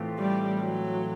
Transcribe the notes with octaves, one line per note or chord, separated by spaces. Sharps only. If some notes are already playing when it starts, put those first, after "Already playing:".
Already playing: A2 E3 A3 C4 F4
G3
F#3